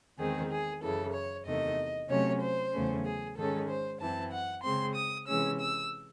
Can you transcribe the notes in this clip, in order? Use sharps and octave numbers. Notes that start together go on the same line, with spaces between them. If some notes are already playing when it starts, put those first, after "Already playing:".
E2 D#3 G#3 C4 G#4
G#4
F#2 C#3 E3 A4
C#5
E2 C3 D#3 A3 D#5
C3 F#3 A3 C#4 C#5
C5
E2 C#3 F#3 A3 C#4
G#4
G#2 D#3 G#3 C#4 A4
C5
F#2 E3 C4 A5
F#5
C#3 G#3 C4 C6
D#6
C3 E3 G#3 C#4 E6
E6